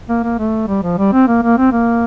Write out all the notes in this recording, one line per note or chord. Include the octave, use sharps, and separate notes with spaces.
A#3
A#3
A3
G3
F3
G3
C4
A#3
A#3
C4
A#3